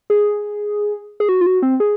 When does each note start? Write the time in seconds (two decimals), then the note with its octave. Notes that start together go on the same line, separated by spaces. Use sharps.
0.10 G#4
1.20 G#4
1.29 F#4
1.41 F4
1.46 F#4
1.62 C4
1.80 G#4